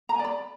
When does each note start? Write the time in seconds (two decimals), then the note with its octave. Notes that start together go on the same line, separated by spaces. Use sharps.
0.09 A#5
0.14 G#5
0.19 D5
0.24 B5